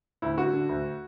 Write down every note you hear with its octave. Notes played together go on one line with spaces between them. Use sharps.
D2 E4
D3 F#4
D3
D2